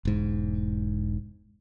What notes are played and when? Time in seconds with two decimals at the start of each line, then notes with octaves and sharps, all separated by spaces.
0.05 E1 G#2